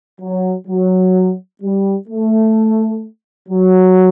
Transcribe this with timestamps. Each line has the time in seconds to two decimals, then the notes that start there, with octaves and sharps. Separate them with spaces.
0.21 F#3
0.68 F#3
1.62 G3
2.08 A3
3.49 F#3